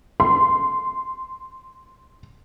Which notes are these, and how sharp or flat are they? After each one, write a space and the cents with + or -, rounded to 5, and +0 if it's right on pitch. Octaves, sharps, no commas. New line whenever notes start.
C6 -10